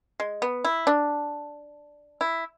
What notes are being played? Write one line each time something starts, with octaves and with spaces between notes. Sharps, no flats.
G#3
B3
E4
D4
E4